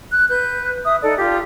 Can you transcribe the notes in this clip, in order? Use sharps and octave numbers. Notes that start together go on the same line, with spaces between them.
F#6
B4 F#6 G6
E5 D#6
D#4 A4 D5
F4 G4